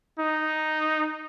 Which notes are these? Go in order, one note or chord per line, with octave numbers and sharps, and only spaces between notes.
D#4